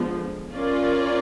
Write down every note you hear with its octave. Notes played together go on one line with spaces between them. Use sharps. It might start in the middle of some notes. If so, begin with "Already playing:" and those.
Already playing: D3 F3 G#3 B3
C#4 F4 A#4 D5